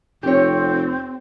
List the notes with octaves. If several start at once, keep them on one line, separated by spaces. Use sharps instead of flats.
F1 C4 G4 C#5